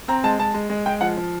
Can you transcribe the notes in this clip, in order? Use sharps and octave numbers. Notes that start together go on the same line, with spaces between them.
C4 A#5
G#3 A5
G#3 A5
G#3
G#3
G#3 G5
F3 F#5
F3